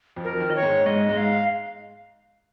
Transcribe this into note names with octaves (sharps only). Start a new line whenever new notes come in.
F2 F3
A#4
F3
D#3
D#5
C#5
G#2 G#3
G#2 G#3 D#5
G#2 G#3
F5